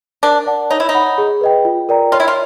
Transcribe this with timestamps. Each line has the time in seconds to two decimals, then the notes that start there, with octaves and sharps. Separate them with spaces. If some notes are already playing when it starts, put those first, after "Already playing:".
0.23 D4 A#4
0.46 D5 F#5 A5
0.70 D#4 C#5
0.80 E4
0.89 D#4
0.94 F#5 B5
1.18 G#4
1.41 B4 D#5 G5
1.65 F4
1.89 A#4 D5 G5 A#5
2.12 F4 C#5
2.20 E4
2.28 F4